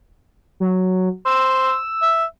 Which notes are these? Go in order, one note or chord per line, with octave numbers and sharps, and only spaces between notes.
F#3
C5 E6
E5